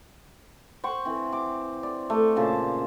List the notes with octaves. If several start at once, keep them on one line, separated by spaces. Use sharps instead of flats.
C5 F#5 G5 C#6
E3 C4
D6
D5
A3
A#2 C#3 C5 A5